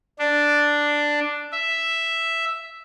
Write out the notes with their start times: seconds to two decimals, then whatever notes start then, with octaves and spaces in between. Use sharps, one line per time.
0.19 D4
1.52 E5